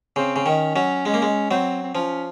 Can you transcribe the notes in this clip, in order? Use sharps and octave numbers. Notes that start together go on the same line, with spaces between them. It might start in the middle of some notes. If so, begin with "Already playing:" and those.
C#3 C4
C#3
D#3 C#4
F#3 C#4
G#3 C#4
A#3
G#3
F#3 C4
C4
F3 C#4